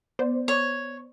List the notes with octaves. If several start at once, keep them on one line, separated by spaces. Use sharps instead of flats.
B3 C5 D5
C#5